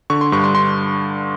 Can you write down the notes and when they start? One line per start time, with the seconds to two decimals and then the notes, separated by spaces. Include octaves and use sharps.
0.10 D3 C#6
0.21 C6
0.32 G2 C#6
0.44 C6
0.55 C6